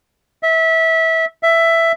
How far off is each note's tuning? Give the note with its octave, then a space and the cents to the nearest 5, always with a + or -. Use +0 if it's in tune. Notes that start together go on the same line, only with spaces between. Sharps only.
E5 -20
E5 +10